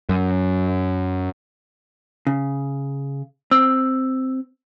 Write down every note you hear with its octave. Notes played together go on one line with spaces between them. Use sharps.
F#2
C#3
C4 E6